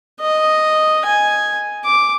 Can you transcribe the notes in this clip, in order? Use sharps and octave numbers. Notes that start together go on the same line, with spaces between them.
D#5
G#5
D6